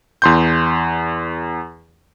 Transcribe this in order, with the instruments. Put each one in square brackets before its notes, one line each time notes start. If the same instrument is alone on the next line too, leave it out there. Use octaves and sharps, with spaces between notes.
[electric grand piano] E2 C6 G6